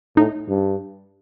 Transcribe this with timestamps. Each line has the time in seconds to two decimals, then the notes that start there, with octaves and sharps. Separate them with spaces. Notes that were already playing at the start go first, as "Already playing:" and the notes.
0.17 A2 D#4
0.48 G2